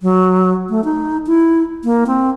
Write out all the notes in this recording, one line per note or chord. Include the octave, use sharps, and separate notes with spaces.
F#3
A3
D#4
E4
A#3
C4